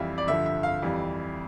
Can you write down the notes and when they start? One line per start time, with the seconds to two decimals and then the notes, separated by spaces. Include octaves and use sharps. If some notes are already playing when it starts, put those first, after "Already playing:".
Already playing: F2 E3 G3 E5 F5
0.18 D5
0.27 G2 D3 F3 E5
0.46 E5
0.63 F5
0.82 F2 E3 G3